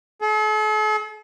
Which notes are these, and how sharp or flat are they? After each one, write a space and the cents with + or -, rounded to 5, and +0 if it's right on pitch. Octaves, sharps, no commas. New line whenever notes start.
A4 -45